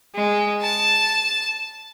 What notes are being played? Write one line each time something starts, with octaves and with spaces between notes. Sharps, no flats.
G#3
A5